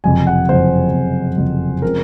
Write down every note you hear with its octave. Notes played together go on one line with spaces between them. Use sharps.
F#1 F2 C3 G#5
F#5
F#1 F2 C3 C5
F#1 F2 C3
F#1 F2 C3
C#3 F3 G#3 C4 A#4